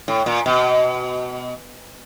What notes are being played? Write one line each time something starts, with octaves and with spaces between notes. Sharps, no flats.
A2
A#2
B2